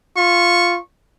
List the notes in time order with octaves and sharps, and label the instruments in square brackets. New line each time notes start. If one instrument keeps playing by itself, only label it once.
[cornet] F4 [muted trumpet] C#6